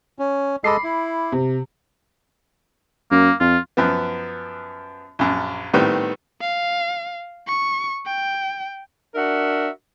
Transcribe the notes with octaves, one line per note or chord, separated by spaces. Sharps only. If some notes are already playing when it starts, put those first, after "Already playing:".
C#4
G#3 A4 D#5 B5 D6 C7
E4
C3
F#2 A#3
F2 F4
F#2 F3 B3
A#1 F#2
A2 D#3 G3 B3 C4
F5
C#6
G5
D4 F#4 A#4 E5